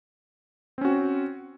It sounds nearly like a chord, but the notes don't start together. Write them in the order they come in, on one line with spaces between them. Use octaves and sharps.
C4 C#4 F#4